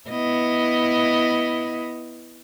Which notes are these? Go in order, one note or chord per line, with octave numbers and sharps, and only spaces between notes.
B3 E4 D#5